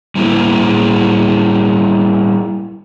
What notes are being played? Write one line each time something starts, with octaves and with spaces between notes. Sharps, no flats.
G3 A#3 E4 G#4